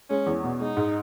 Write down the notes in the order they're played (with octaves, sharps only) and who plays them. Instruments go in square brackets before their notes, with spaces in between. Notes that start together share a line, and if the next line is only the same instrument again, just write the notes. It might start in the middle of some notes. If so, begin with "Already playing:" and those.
[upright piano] G#3 [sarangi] C#4
[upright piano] E2
B2
[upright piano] G#3 [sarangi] D#4
[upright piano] G#2